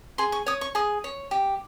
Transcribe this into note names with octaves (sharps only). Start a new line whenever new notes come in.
G#4 C6
C#6
C#5 D#6
C#6
G#4 D#6
C#5
G4